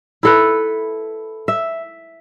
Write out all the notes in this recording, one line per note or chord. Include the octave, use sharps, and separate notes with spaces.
E4 A4 B4
E5